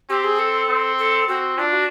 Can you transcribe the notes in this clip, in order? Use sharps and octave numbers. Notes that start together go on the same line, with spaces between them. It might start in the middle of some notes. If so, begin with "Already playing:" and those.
C4 G4
G#4
A4
C4
A4
C4 F#4
D4 F4
F#4